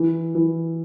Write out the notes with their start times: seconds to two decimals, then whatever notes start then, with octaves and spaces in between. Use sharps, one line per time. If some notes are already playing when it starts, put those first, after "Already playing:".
Already playing: E3
0.35 E3